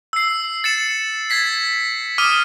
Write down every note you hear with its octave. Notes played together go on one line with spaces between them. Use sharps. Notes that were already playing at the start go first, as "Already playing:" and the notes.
E6 C7
A6 C#7 E7
G#6 A6 B6 C7
D6 D#6 F6 D#7